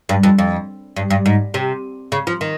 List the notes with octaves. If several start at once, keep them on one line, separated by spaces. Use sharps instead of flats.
G2
F2
F2
G2
G2
G#2
C3
C#3
F3
D#3